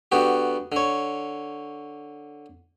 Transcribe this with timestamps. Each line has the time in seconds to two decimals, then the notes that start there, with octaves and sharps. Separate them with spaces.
0.12 D3 B3 F#4 G4
0.72 D3 C#5